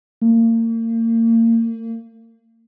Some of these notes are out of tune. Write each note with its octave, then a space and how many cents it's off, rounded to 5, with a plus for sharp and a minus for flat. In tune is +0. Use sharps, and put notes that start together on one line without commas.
A#3 -35